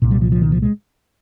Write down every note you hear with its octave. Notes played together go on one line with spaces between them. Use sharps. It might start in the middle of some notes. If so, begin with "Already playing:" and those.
C2 A#2
G3
F3
F3
D#3
F3
G#3